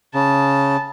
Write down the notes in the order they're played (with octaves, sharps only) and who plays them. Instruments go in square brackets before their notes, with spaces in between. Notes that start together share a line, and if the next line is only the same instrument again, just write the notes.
[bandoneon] C#3 [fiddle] A5